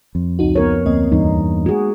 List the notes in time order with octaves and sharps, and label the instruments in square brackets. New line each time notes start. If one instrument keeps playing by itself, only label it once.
[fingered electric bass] F2
[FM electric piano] C#2 D#4 F#4
[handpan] B3 A#4 C#5
[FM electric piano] D2 C4 D#5 [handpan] A#3
[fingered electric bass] E2 G2 [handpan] D#4
[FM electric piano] G#3 [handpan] F#4 G#4